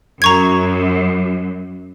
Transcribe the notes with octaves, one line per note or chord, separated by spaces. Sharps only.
F#2 A#5 C#6 G#6